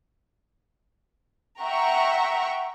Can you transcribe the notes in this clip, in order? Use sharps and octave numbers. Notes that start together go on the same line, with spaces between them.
E5 F#5 G5 A#5 C#6